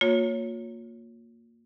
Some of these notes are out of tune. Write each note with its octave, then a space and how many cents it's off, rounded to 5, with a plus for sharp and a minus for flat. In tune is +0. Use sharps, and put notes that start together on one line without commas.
A#3 -10 F4 +45 C#5 +5